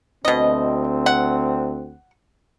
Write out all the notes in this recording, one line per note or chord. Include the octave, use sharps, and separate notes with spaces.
D2 B2 C4 D#5
F#5